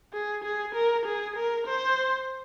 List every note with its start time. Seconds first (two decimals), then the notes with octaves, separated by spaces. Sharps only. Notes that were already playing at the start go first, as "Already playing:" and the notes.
0.13 G#4
0.44 G#4
0.75 A#4
1.05 G#4
1.36 A#4
1.67 C5